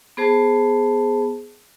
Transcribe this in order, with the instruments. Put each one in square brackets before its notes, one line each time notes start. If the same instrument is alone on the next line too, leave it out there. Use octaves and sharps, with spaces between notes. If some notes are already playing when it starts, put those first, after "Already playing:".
[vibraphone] B3 G#4 C5 A5